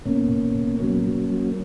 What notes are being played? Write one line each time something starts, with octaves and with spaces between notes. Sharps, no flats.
B2 A#3 C#4
B2
B2
F#3 A#3 C#4
F#3
F#3